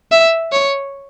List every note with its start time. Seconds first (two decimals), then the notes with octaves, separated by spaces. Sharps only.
0.11 E5
0.52 C#5